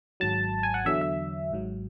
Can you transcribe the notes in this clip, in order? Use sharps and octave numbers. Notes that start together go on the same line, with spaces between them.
G#1 G#2 F#3 A5
G#5
F#5
E2 D3 F#3 E5
E5
G#1 G#2 F#3